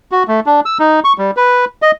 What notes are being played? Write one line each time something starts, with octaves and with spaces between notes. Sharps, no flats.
F#4
A3
D4
E6
D#4
C#6
G3
B4
D#5